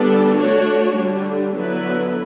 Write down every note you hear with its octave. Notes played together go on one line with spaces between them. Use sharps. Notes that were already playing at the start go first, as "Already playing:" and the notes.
Already playing: D3 G3 B3 D4 A4
A3 D4 F#4 C#5
D3 G3 D4
D3 F#3 B3 E4 B4